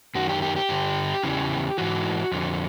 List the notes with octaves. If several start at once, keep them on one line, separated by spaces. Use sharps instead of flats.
F#2 D#3 F#4
G4
G4
G4
G2 D3
E2 C#3 E3
G#2 E3 F#4
F2 D3